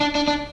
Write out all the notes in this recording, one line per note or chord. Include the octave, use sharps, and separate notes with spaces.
D4
D4
D4